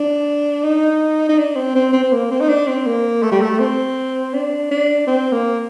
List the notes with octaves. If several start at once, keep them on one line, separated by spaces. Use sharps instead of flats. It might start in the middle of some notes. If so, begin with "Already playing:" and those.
Already playing: D4
D#4
D#4
D4
C4
C4
C4
C4
A#3
C4
D#4
D4
C4
A#3
A3
G3
A3
C4
D4
D4
C4
A#3